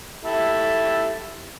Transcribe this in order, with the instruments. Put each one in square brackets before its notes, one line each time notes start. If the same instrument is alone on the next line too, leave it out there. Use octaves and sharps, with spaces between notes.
[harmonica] E4 G4 A4